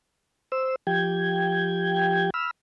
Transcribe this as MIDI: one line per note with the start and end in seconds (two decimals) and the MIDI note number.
0.52 0.76 72
0.52 0.76 88
0.87 2.30 53
0.87 2.30 67
0.87 2.30 79
0.87 2.30 92
2.34 2.51 83
2.34 2.51 88
2.34 2.51 89